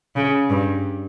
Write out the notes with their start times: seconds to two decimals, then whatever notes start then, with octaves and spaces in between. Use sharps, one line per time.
0.16 C#3
0.50 G2